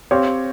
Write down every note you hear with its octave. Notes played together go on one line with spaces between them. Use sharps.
C4 G4 C#5 F5